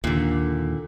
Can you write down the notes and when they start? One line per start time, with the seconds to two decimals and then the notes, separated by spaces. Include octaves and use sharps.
0.04 D#2 A#2 D3